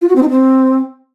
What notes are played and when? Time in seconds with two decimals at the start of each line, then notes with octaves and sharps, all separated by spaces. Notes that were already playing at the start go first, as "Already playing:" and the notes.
0.02 F4
0.09 F#4
0.16 C4
0.23 D#4
0.30 C4